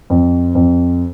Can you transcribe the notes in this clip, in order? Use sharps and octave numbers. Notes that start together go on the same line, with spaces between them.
F2
F2